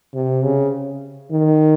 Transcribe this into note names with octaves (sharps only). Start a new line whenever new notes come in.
C3
C#3
D#3